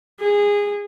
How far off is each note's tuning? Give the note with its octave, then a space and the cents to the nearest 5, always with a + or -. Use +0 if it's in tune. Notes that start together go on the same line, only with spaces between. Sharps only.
G#4 -20